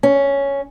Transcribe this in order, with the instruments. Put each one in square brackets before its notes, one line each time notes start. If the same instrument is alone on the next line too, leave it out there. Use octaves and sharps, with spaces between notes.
[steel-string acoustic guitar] C#4